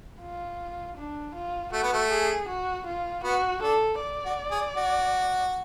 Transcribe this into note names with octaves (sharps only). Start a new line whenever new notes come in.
F4
D4
F4
A3 F#4
B3
A3
G#4
F#4
F4
B3 F#4
D4 A4
D5
F#4
G#4
F#4